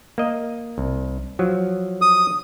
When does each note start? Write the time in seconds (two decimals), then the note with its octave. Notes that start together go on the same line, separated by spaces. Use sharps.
0.18 A#3 D#5
0.78 C2
1.39 F3 F#3
2.02 D#6